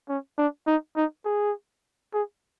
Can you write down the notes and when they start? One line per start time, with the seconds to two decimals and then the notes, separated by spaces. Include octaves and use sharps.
0.09 C#4
0.38 D4
0.67 D#4
0.96 D#4
1.25 G#4
2.13 G#4